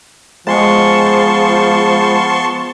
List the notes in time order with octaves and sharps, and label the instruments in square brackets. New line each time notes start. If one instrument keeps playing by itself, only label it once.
[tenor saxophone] F3 [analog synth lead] G#3 [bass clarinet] B3 [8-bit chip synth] A5 C6 C#6